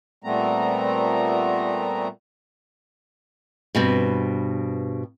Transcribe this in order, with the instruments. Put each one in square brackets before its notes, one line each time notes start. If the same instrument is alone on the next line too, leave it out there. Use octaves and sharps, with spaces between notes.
[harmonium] A#2 G3 A3 B3 C4 A#5
[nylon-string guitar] G2 B2 C4